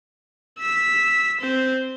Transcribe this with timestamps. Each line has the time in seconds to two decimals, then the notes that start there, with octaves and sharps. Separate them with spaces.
0.59 E6 B6
1.40 C4 C5